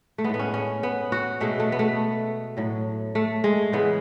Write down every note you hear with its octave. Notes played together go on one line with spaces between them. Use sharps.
A3
G#3 B3
A2
B3
C#4
C#4
B3
F#4
B2 G#3 A3
A3
B3
A3
A2 F#3
A3
G#3
C#3 E3 G#3 B3